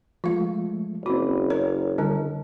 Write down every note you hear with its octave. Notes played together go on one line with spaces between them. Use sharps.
F3 G#3 A3 F4 F5
F#1 C4 F#4 B5
A#4 C#5
D3 G3 D4